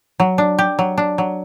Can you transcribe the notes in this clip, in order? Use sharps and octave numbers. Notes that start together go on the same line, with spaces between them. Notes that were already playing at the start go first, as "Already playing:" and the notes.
F#3
D4
G4
F#3
D4
F#3